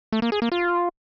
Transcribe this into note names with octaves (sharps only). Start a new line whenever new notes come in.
A3
A#3
G#4
A#3
F4